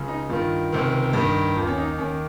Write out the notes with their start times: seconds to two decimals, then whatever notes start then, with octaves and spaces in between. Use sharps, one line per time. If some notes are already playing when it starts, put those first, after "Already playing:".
Already playing: C#2 C#3
0.08 D#4
0.29 G2 D#3 F4
0.72 C#2 C3 D#3
1.13 G2 D#3
1.55 D#2 D#3 F4
1.67 C#4
1.78 D#4
1.98 D#2 D#3 C#4